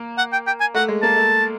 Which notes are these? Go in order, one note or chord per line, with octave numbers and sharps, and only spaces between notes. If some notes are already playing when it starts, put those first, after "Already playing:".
Already playing: A#3
F#5
G5
G5
G#5
A3 F#5
G#3
A#3 A5
A3